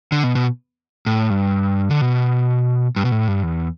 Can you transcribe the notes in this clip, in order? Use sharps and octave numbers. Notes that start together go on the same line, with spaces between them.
D3
B2
B2
A2
G2
D3
B2
G2
B2
A2
G2
E2